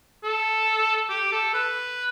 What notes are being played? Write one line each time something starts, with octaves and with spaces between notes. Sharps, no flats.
A4
G4
A4
B4